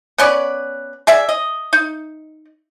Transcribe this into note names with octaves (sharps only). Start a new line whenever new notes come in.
B3 C#4 B4 D5
G#4 D5 E5
D#5
D#4